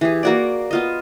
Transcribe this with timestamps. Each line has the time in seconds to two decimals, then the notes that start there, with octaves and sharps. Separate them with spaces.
0.01 E3 G4 G#4
0.23 A#3 F#4 D5
0.71 B3 F4 D#5